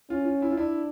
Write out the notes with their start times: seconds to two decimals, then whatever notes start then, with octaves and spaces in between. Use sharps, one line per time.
0.10 C#4 F4
0.26 F4
0.42 E4
0.51 F4
0.57 D4 E4